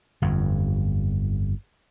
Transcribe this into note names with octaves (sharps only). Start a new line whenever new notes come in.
G1 F2